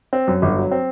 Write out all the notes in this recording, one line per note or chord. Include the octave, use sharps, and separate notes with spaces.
C4
F#2
G1
F#3
C4